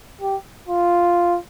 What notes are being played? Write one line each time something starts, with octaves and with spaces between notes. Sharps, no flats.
G4
F4